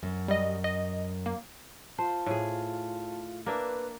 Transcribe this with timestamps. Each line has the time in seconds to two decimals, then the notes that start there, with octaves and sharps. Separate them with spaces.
0.03 F#2
0.28 G3 D#5
0.64 D#5
1.26 A#3
1.99 F4 C5 A5
2.26 A2 G#4
3.46 A#3 D4 B4 E5